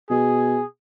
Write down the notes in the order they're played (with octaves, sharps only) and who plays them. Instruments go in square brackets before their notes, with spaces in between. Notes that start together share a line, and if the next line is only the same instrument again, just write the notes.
[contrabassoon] B2 [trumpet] G#4